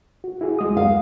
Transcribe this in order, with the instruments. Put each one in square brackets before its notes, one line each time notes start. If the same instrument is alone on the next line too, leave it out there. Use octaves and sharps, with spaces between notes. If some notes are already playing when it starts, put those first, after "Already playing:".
[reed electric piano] F#4
E4 F#4 G#4
D2 G#3 D#6
[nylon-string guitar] F5